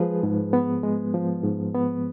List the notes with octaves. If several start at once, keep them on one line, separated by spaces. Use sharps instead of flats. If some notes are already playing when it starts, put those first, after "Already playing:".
Already playing: F3 G#3 G#4 B4
G#2
B3
G#3
F3
G#2
B3